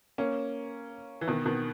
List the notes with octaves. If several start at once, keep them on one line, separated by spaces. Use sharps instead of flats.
A#3 C#4
E3
B2 D#3
B2 D#3